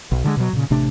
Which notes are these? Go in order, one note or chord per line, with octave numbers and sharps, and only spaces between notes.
B1
D3 D#3 G#3
B2 F#3
A#2 C#3
A1 C3 A3 D4